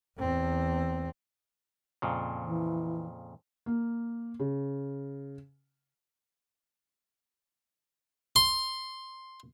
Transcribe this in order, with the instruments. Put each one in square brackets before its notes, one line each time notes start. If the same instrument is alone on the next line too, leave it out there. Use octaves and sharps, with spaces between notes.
[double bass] E2 C4
[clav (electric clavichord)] F2 A#2 C#3
[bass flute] E3
[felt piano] A#3
C#3
[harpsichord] C6